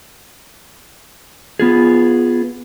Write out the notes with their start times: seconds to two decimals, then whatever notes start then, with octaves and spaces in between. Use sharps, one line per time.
1.59 B3 F4 G#4